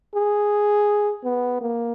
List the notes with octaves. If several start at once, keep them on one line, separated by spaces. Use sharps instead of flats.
G#4
B3
A#3